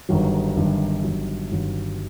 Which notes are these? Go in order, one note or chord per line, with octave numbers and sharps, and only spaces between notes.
G1 G2 D#3 F#3
G1 G2 D#3 F#3
G1 G2 D#3 F#3
G1 G2 D#3 F#3